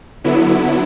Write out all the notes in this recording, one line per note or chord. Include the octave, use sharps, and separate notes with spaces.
D3 F#3 B3 E4